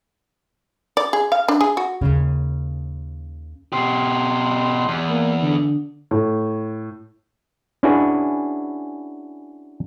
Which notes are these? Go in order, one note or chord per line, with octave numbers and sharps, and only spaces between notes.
D5
G#4
F5
D4
G#4
F#4
D#2 C#3
B2 G4 C6
E2
A#3
D3
A2
C#4 D4 E4 F#4 G#4 B4